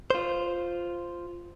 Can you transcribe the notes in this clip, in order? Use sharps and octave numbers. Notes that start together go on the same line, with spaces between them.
F4 C5